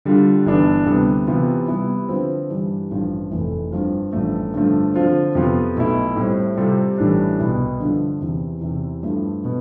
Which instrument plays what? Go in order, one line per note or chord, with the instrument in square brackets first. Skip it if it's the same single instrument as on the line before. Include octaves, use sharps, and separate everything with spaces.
[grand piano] D3 G3 D4 F4
G1 G2 E3 B3 D4
D2 C3 G3 B3
C3 E3 B3 F4
C3 G3 B3 E4
D3 F3 C4 F4 B4
G2 E3 G3 D4
A1 G2 F3
F1 F2 E3 A3
G2 F3 C4 F4
A1 G2 F3 A3
G2 D3 F3 A3
D3 F3 C4 F4 C5
F2 C3 F3 B3 F4
B1 B2 A3 E4
A2 G3 C4
C3 G3 C4 F4 A4
A1 A2 E3 G3 D4
C2 B2 B3 E4
G2 D3 F3
E2 C3 E3
E2 C3 E3
G2 F3 A3 E4
B2 B3